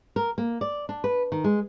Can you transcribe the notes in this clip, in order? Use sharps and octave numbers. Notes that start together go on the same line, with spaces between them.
A#4
A#3
D5
D4
B4
D#3
G#3